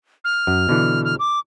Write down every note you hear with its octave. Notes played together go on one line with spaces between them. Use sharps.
F6
F#2
B2 D3 E3
F6
D6